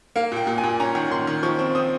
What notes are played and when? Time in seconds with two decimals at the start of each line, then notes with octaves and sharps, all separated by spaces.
0.16 A#3 F5
0.32 A#2 G5
0.47 A#2
0.58 G#5
0.63 A#2
0.80 C#4 A#5
0.95 D#3
1.11 D#3 C6
1.27 D#3
1.43 F3 C#6
1.59 C4
1.75 C4 D#6